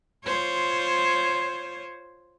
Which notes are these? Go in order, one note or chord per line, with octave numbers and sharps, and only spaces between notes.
F4 C5 C#5